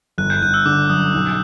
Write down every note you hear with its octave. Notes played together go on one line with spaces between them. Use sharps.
G1 F#6
G6
G1 F#6
E6
D3 D6
F#2 D#6
B1